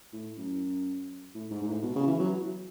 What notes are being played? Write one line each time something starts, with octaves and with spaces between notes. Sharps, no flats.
A2
F#2
A2
G#2
G#2
A2
B2
C#3
E3
F#3